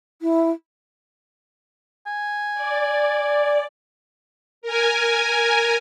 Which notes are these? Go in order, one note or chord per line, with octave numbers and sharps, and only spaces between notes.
E4
G#5
D5
A#4 G#5